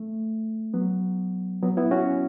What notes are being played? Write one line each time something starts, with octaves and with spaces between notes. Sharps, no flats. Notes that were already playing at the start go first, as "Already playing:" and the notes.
Already playing: A3
F#3 B3
F#3 B3
B3 E4
C#4 F#4